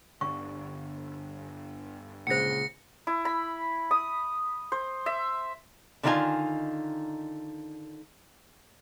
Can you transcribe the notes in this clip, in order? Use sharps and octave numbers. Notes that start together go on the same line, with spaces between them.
G1 D3 C#6
A#2 C#3 G#3 C5 F#5 A#6 C#7
E4
B5
D#6
C5
E5
D3 D#3 G3 D#4 F4 G#5